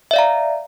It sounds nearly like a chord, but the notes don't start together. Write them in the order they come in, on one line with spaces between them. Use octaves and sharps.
E5 D5 F5 A#5